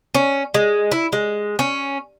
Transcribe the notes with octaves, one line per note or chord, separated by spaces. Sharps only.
C#4
G#3
E4
G#3
C#4